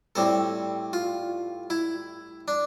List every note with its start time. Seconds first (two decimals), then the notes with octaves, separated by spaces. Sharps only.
0.15 A2 G3 C4 A4
0.93 F4
1.70 E4
2.48 D4